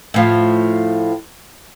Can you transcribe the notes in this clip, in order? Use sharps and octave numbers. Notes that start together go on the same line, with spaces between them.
A2 F3